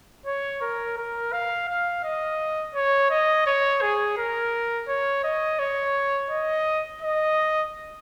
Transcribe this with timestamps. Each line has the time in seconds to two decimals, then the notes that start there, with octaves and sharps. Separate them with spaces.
0.26 C#5
0.61 A#4
0.97 A#4
1.32 F5
1.68 F5
2.04 D#5
2.75 C#5
3.10 D#5
3.46 C#5
3.81 G#4
4.17 A#4
4.88 C#5
5.24 D#5
5.59 C#5
6.30 D#5
7.01 D#5